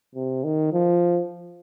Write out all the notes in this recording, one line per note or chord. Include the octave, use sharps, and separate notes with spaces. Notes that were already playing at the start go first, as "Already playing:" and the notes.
C3
D#3
F3